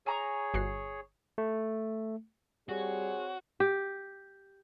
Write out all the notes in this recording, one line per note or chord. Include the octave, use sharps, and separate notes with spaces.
G#4 C#5 G#5 A#5 C#6
G1 F#4 C7
A3
G3 C4 F#4 G#4 C#5
G4